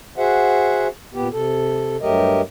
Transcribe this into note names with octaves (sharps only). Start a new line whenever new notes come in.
F#4 G#4 C5 E5 F#5
A#2 B3 G4
C3 A4
G2 F#3 A3 G4 A#4 D#5